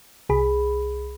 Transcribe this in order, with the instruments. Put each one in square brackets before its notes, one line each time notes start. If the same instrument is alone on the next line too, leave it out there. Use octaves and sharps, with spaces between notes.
[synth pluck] C2 G#4 B5